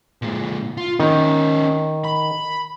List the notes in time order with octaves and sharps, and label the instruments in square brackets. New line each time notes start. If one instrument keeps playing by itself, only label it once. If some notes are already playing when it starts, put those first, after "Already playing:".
[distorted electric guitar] A#2 G#3
F4
[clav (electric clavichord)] D#3 [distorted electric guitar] C#4 D#4
[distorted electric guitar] B5